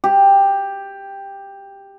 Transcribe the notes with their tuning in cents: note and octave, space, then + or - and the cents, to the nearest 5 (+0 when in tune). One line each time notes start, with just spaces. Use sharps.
G4 +10